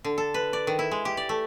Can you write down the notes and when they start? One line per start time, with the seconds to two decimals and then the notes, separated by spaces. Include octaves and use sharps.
0.04 D3
0.18 A4
0.34 B4
0.53 D5
0.67 D#3
0.79 E4
0.91 G#3
1.05 G4
1.17 D5
1.29 A3